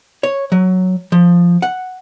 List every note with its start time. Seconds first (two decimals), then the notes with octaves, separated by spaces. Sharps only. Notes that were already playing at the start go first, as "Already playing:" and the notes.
0.23 C#5
0.52 F#3
1.12 F3
1.62 F#5